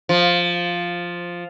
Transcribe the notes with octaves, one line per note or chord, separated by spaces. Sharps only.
F3